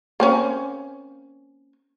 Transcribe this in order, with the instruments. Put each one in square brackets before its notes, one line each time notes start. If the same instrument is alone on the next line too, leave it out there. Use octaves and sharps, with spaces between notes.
[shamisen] A#3 C4 C#4